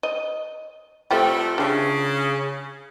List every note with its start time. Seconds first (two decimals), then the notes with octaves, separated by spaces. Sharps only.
0.03 D#5
1.11 C3 G3 A3 C4 F4 G4
1.58 C#3 D4 F4